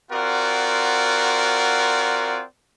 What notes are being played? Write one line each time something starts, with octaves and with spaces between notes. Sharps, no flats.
C4 F4 F#4 A#4 D5 F#5